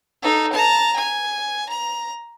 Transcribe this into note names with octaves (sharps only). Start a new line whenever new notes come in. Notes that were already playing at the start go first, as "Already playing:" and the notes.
D#4 A4
A5 A#5
G#5
A#5